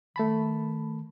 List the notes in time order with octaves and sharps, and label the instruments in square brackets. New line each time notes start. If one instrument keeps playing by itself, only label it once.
[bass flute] D#3 [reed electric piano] A3 A5 B5